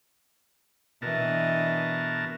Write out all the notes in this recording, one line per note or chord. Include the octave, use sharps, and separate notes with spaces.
B2 E3 D4 A#4 D#5 A5